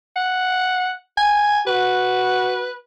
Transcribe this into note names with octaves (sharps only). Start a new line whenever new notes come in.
F#5
G#5
F#4 B4